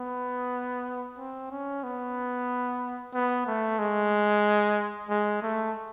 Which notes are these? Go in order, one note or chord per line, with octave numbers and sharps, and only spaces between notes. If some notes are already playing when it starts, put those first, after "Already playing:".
Already playing: B3
C4
C#4
B3
B3
A3
G#3
G#3
A3